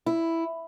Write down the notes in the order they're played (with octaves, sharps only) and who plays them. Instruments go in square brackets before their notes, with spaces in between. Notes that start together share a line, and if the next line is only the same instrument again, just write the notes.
[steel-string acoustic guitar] E4